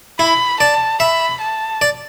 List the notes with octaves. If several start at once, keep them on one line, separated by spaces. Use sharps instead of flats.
E4 B5
D5 A5
E5 B5
A5
D5